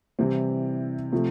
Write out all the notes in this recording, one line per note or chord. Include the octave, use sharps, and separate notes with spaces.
C3 E3 G3 C4 E4
C3 F3 A3